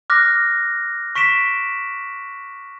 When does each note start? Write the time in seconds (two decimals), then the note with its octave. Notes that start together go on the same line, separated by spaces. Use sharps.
0.10 D6 F6 F#6 A#6
1.15 C#6 B6 D7 E7